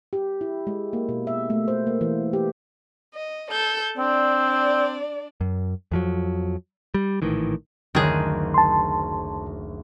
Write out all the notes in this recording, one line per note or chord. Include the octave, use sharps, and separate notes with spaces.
G4
E4
G#3
A#3
B2
E5
A3
C5
A#3
E3
G4
D#5
A4 G6
C4 D4 D5
F#2
F2 F3 F#3
G3
A#1 A2 D#3 E3
F#1 D2 D#3 G#4 F#6
A5 C6